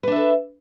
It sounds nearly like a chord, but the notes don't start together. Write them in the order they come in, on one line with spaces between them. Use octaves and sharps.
B4 D4 E5 A4